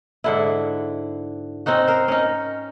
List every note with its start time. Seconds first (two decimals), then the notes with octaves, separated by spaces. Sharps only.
0.24 G#2 D3 E4
1.66 C4 C#4 D#4 F#4
1.88 A#4 C5
2.08 C#4 D#4